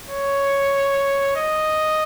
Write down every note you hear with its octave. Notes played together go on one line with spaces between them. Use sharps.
C#5
D#5